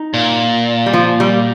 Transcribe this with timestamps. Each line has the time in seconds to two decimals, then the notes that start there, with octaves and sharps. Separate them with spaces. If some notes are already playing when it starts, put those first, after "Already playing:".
Already playing: D#4
0.14 A#2
0.86 G3
0.93 F3
1.20 G3